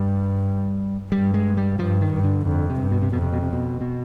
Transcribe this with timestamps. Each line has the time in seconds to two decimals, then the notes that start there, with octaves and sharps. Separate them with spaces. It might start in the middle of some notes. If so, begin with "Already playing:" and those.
Already playing: G2 G3
1.11 G2 G3
1.34 G#3
1.57 G3
1.79 G2 F3
2.01 D#3
2.13 G2
2.24 D3
2.46 F2 D3
2.70 C3
2.81 G2
2.91 B2
3.02 C3
3.12 F2 B2
3.22 C3
3.33 B2
3.42 C3
3.53 B2
3.81 B2